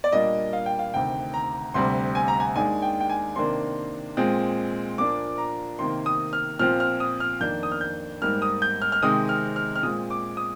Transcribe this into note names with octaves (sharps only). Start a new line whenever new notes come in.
D5
A#2 G3 A#3 D4 D#5
F5
G5
F5
D2 C3 D#3 G5
A#5
D2 C3 G3 C6
G#5
A#5
G#5
D#2 D#3 G#3 D4 G#5
G5
G5
G#5
C3 D#3 A#3 D4 C6
A#2 G#3 C4
A#2 F3 A#3 D4 D6
A#5
C3 D#3 A#3 C6
D#6
F6
A#2 F3 C4 F6
F6
D#6
F6
F2 D#3 A#3 D4 G6
D#6
F6
G6
G#2 G3 A#3 F6
D#6
G6
F6
F6
C3 D#3 G#3 C4 D#6
F6
F6
F6
A#2 G#3 C4 D#6
D6
D#6